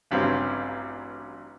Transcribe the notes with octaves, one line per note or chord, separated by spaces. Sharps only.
A1 G2 F#3 C4 C#4 F4